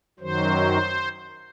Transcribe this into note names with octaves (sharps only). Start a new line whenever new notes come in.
F#2 D#3 F#3 C5